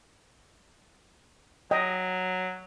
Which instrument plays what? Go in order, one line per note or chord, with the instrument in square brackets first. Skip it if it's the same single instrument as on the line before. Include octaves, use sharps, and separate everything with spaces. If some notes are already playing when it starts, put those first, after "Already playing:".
[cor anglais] F#3 [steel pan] D#5 G5